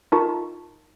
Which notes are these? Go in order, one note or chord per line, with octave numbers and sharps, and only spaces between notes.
D#4 F4 A#4 A5 C#6